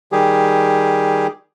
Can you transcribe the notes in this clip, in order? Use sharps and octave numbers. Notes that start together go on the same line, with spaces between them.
D#3 G3 G4 G#4